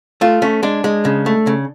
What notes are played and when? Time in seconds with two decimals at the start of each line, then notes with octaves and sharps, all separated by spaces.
0.21 A3 F4
0.42 A3 C#4
0.63 G#3 D4
0.84 G#3
1.05 C#3
1.26 A3
1.47 C#3